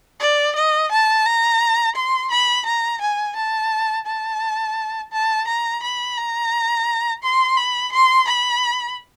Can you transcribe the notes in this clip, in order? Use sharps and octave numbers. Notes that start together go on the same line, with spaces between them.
D5
D#5
A5
A#5
C6
B5
A#5
G#5
A5
A5
A5
A#5
B5
A#5
C6
B5
C6
B5